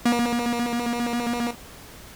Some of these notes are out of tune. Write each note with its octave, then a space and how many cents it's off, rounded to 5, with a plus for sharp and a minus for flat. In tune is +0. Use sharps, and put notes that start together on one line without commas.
A#3 +40